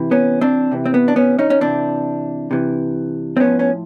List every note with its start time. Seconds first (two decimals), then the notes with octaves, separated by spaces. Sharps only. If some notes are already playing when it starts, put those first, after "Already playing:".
Already playing: C3 E3
0.11 B3 C#4
0.41 C4 D4
0.72 C3 E3
0.86 C4
0.94 B3
1.08 D4
1.16 B3 C#4
1.39 C#4 D#4
1.50 C#4
1.61 C3 E3 C4 D4
2.51 C3 E3
3.37 C4
3.40 A2 F3 B3 C#4
3.59 C#4